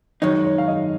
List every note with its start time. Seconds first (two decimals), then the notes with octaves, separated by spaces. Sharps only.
0.22 F#2 D#3 G#3 D#4 C#5
0.44 C#5
0.58 F5
0.68 D#5